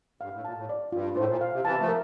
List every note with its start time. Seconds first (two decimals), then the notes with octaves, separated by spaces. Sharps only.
0.21 G2 F5
0.33 A2
0.45 A#2 A5
0.57 A2
0.69 D5
0.92 G2 F4
1.12 A#2
1.17 A2 C5
1.29 A#2
1.41 F5
1.53 C3
1.64 C3 E3 A5
1.80 F3 A3
1.88 A#4